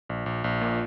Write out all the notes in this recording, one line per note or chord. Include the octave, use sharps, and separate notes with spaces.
A#1
A#1
A#1
A#2